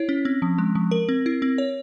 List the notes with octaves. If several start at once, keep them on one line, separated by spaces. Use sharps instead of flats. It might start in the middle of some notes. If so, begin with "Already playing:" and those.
Already playing: E4 C#5
C#4
C4
F3
G#3
F3
A#4
C4
E4
C4
C#5